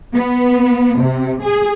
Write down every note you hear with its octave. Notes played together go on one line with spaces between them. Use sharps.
B3
C3
G#4